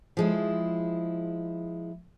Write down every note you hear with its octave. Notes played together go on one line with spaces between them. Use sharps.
F3 G#3 E4